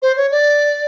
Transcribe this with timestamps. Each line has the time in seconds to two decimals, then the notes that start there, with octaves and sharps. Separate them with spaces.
0.02 C5
0.17 C#5
0.32 D5